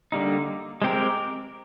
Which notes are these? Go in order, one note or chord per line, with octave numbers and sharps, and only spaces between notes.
D3 G3 A#3 D#4
G#3 C4 G4 A#4